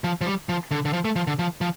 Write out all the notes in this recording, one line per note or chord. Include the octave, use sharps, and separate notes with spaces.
F3
F3
G3
F3
D3
D3
F3
A3
F3
D3
F3
F3